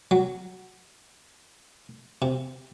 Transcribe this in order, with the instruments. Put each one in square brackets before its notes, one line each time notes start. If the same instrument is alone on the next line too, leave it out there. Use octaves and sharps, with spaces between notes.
[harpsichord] F#3
C3